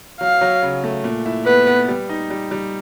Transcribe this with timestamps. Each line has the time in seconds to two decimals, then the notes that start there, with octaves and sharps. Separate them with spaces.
0.21 F#3 F5
0.41 F#3
0.63 C#3
0.84 A3
1.04 A#2
1.26 E4
1.46 B3 B4
1.67 B3
1.88 G3
2.09 D#4
2.30 G3
2.51 G3